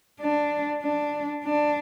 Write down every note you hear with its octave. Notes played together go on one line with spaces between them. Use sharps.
D4
D4
D4